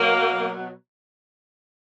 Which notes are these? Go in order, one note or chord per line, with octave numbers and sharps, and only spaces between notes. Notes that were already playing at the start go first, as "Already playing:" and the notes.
Already playing: B2 F#3 A#3